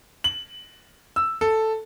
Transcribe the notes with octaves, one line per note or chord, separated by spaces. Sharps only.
F#7
E6
A4